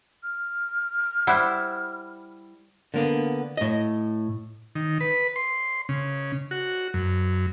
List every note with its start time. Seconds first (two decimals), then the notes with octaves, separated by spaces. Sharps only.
0.23 F6
1.27 G3 E4 C5 F#5 F#6
2.94 D3 A#3 B3
3.57 A2 D#5
4.75 D#3
5.00 B4
5.36 C6
5.89 C#3
6.51 F#4
6.94 F#2